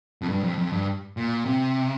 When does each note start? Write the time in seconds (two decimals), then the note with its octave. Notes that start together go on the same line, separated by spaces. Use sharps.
0.22 F2
0.29 G2
0.43 F2
0.58 F2
0.73 G2
1.17 A#2
1.45 C3